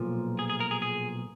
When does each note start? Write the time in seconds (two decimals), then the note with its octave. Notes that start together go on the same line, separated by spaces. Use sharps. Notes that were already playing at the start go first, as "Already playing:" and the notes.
Already playing: B1 A#2 F3
0.39 G#4
0.50 G#4
0.60 A#4
0.71 G#4
0.82 G#4